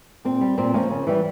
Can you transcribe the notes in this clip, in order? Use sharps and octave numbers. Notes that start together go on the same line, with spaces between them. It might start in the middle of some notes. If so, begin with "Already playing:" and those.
A#2 C4
G3
A#2 C4
F3 G#3 A#3 C#4
C#3
E3 G3